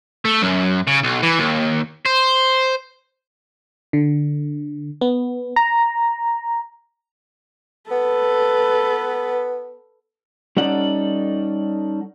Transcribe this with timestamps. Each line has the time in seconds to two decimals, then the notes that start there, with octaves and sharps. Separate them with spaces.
0.25 A3
0.42 F#2
0.87 C#3
1.04 B1
1.23 E3
1.40 D#2
2.06 C5
3.93 D3
5.01 B3
5.56 A#5
7.91 B3 A4 B4
10.57 G3 C#4 D#4 A4 D5 F#5